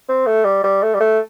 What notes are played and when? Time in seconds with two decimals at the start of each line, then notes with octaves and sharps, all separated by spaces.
0.09 C4
0.26 A3
0.45 G3
0.64 G3
0.83 A3
0.95 G3
1.00 A3